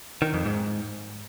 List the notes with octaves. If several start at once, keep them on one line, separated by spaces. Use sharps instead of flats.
D#3
F2
G#2